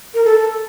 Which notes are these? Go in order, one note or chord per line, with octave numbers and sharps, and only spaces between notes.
A#4
A4